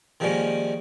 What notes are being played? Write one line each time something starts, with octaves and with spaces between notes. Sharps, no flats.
D#3 F3 G3 G#3 A#3 C#4